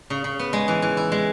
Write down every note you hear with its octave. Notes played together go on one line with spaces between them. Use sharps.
C#3
C#3
B3
G#3
E3
E3
E4
G#3